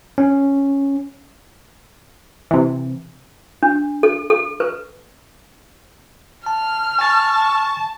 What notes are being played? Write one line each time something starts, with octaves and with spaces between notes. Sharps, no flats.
C#4
C3 E3
D4
A4
A4
B4
A5 F6
G#5 A5 C#6 A6